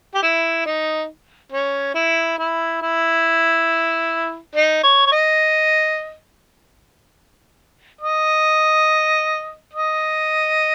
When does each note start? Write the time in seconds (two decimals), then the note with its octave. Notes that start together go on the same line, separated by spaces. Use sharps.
0.14 G4
0.22 E4
0.65 D#4
1.52 C#4
1.94 E4
2.38 E4
2.81 E4
4.55 D#4
4.83 C#5
5.06 C#5
5.12 D#5
8.01 D#5
9.73 D#5